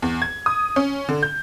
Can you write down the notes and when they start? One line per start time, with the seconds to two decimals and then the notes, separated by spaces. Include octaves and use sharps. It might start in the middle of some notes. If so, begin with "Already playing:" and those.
0.02 E2
0.22 G#6
0.46 D#6
0.76 C#4
1.09 D3
1.23 G6